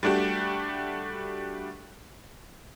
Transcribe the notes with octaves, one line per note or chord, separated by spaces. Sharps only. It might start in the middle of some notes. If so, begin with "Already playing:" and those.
G3 A3 D4 F#4 G4